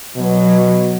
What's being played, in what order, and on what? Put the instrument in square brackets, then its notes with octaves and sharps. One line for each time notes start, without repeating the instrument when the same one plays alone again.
[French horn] B2 [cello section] F#3